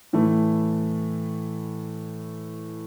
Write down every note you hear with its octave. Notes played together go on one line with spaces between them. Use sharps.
A2 E3 A3